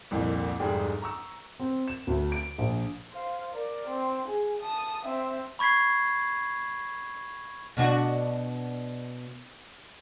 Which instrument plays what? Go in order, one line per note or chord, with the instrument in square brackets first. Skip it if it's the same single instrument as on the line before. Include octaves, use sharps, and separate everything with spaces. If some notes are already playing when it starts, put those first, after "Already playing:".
[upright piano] C2 F2 A#2
F1 G#2 G3 G#4 G5
A#5 C#6 E6
C4
E7
D2
D7
A#1
[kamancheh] C5 F5
A#4 D5
C4
G#4
A5 D#6
C4 E5
[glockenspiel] B5 C#6 G#6 B6 C7
[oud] B2 D4 F#4